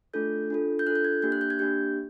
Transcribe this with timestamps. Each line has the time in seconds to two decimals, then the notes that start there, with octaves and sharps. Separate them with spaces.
0.14 A3 D4 F4 A4 G6
0.50 D4 F4 A4
0.79 G6
0.86 D4 F4 A4 F#6
0.95 G6
1.05 G#6
1.22 A#3 D4 G4 G6
1.32 F#6
1.41 G6
1.50 G#6
1.59 A#3 D4 G4 G6